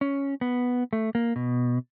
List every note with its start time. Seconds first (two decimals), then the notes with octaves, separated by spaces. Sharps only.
0.01 C#4
0.41 B3
0.93 A3
1.15 A#3
1.36 B2